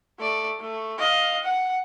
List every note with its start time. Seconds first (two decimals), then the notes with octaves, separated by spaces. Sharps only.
0.20 A3 D5
0.60 A3
0.99 D#5 F5
1.43 F#5